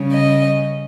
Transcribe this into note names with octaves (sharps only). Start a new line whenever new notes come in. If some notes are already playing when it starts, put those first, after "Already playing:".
Already playing: C#3 G3 C#4
D#5